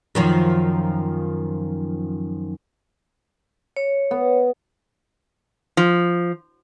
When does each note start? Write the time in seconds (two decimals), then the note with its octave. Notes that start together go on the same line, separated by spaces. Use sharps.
0.15 F#2 D#3 F3
3.76 C#5
4.11 B3
5.77 F3